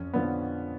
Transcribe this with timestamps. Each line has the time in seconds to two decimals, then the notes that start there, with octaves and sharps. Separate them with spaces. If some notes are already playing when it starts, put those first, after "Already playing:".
Already playing: F2 C#4
0.14 D3 F3 B3